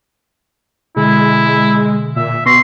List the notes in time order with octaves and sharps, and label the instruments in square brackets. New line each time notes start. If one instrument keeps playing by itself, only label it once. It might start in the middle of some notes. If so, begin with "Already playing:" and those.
[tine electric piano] B2 D3 [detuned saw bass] G#3 [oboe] E4
[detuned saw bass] A#2 [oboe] E5
[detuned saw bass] B2 [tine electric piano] B3 C#6 A#6 [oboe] C6